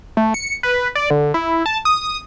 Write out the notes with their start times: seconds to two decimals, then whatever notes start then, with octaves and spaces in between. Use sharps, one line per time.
0.17 A3
0.34 C#7
0.63 B4
0.95 D5
1.10 D3
1.34 E4
1.66 A5
1.85 D#6